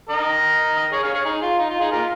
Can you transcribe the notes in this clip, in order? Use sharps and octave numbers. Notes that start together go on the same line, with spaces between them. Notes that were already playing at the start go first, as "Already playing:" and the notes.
A#4 D#5
G#4 C#5
C#5 F5
G#4 C#5
D#4 G#4
F4
D#4
F4
D#4 G#4
F4 A#4